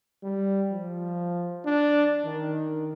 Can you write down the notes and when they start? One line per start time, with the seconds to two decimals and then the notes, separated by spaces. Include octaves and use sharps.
0.23 G3
0.72 F3
1.66 D4
2.25 D#3